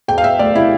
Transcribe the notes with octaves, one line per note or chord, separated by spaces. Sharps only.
E1 G5
F5
E1 E5
D2 D5
C3 E4